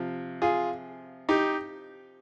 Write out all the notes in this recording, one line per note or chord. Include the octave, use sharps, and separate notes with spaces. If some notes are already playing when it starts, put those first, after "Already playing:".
Already playing: C3 F3
F4 G#4
D#4 G4